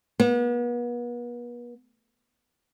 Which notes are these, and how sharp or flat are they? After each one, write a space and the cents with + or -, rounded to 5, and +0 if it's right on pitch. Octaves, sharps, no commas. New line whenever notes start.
B3 -40